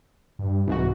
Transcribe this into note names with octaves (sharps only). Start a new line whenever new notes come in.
G2
C2 G#2 E3 F#4